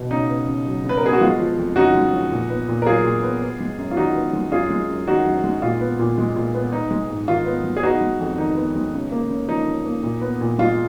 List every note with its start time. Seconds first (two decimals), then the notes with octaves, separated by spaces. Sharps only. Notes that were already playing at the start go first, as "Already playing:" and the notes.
Already playing: B2
0.11 C#3 D#4
0.30 B3
0.48 C#3
0.66 F#3
0.85 C#3 B4
0.97 A#4
1.03 B3 G#4
1.13 F#4
1.21 G#3 F4
1.39 F3
1.58 F2
1.76 C#3 D#4 F#4
1.95 G#3
2.13 F3
2.32 A#2
2.50 B3
2.68 A#2
2.82 A#4
2.86 F#3 F4 G#4
3.05 A#2
3.23 B3
3.42 B3
3.60 G#3
3.78 F#2
3.91 F4
3.97 D#3 D#4 F#4
4.15 B3
4.33 G#3
4.52 F#2 F4 G#4
4.70 G#3
4.89 F#2
5.08 D#3 D#4 F#4
5.25 F#2
5.44 G#3
5.62 A#2 F4
5.81 B3
5.99 A#2
6.18 G#3
6.36 A#2
6.54 B3
6.72 B3 D#4
6.91 G#3
7.10 G#2
7.28 D#3 F4
7.46 B3
7.64 G#3
7.77 G#4
7.83 B3 D#4 F#4
8.01 G#3
8.20 F2
8.38 D#3 D#4
8.56 B3
8.75 G#3
8.94 C#3
9.12 A#3
9.30 C#3
9.48 F3 D#4
9.67 C#3
9.85 A#3
10.03 A#2
10.21 B3
10.41 A#2
10.58 G#3 F4